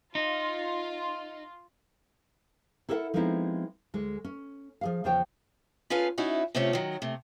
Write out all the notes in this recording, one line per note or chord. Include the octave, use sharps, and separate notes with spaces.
D#4 F4
E4 A4 A#4 C5 E5 F#5
F3 G#3 B3 C4 D#4 E4
D2 G#3
C#4
F3 G#4 F5
E2 C#3 F3 C5 C#5 G5
C#4 F4 G#4 A4 B4 F5
C#4 D#4 E4 F#4
C3 A3 C4 C#4 F4
D#3 F#3
C3 A3